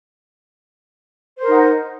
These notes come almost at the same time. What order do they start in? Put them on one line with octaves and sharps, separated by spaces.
C5 A#4 D#4 F#5